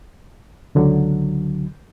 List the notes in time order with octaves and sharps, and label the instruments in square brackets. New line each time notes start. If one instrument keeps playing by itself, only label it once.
[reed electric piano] C#2 D3 F#3